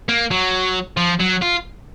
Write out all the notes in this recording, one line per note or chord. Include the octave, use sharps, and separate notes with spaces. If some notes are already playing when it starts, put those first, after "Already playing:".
A#3
F#3
F3
F#3
F4